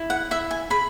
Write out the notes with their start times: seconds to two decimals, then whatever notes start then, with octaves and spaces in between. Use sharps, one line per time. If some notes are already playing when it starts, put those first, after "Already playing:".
Already playing: E4
0.10 F#5
0.31 E4 E5
0.51 G#5
0.70 G#4 B5